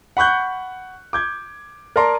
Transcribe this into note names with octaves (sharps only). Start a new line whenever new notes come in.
F#5 B5 C#6 F#6 G6
D6 G6 G#6
A#4 D5 A5 A#5 C6